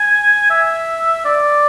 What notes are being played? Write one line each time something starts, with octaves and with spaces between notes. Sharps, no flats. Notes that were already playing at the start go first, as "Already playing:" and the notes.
Already playing: G#5
E5
D5